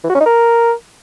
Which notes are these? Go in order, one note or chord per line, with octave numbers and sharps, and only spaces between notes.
E3
F#4
C#4
D#4
A#4